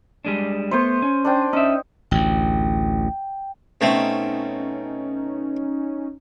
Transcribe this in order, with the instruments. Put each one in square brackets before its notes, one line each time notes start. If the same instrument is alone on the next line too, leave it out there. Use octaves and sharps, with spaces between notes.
[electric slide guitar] G3 G#3 D4
[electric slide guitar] A3 B3 [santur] C5 C#6
[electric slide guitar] C#4
[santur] D4 C5 G5
[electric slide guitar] C#4 E5 [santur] D#4
[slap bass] A1 D2 [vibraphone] G5
[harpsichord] B2 A3 C4 [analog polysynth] C#4 D#4